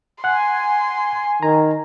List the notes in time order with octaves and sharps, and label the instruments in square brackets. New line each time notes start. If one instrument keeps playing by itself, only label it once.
[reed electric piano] F#5 F#6 [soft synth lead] G#5 [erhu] C6
[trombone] D#3 [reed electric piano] A#5